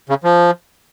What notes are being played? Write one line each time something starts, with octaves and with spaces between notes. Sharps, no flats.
C#3
F3